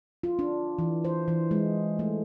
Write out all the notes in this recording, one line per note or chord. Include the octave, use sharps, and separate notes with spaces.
F4
D4
E3
C5
E3
G#3
A3